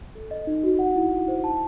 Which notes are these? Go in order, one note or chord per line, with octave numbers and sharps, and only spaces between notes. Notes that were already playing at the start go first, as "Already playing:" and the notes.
A4
D#5
D#4
F#4
F#5
E4
E4
C5
A5